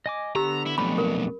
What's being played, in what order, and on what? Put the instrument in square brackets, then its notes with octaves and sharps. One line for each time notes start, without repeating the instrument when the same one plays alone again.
[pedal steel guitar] D#5 G#5 D6
[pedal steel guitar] D3 B3 E6 [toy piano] G4 [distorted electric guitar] A#5
[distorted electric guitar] E4
[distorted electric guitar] B1 F2 [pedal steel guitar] A3 B3 D4 [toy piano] B5
[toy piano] A#4